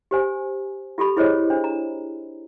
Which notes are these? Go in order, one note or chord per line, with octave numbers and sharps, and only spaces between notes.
G4 C5 G#5
F4 G4 A4 B5
E4 G#4 C5 C#5 D#5
D4 C5
A#5